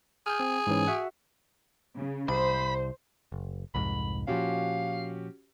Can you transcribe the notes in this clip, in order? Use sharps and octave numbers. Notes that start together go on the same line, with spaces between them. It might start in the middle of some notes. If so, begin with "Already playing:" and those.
G#4 F6 G6
C4
G#2 E3 C#4
F#4 E5 F#5
C#3
C2 C5 B5
F#1
C2 F2 G#2 B5
A#2 F3 C#4 F#4 G4 F5